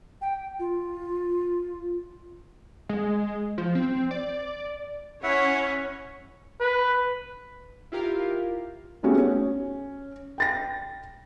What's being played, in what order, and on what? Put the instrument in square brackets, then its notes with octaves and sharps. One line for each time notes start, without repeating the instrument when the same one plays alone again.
[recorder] G5
F4
[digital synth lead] G#3
F3
C4
D5
[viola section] C#4 C#5 [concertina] E4 E5 F#5
[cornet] B4
[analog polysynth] E4 F4 G4 A#4 F5
[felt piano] G#3 A3 B3 C#4 F#4 G4
C#4
G5 A6 A#6